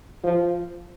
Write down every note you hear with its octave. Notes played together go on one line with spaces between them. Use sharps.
F3